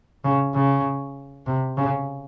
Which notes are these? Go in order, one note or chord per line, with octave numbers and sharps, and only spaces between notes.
C#3
C#3
C3
C#3